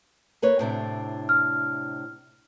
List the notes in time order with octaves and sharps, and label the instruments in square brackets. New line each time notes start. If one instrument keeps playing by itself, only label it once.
[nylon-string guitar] A#3 B4 C#5
A2 C3 D4
[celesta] F6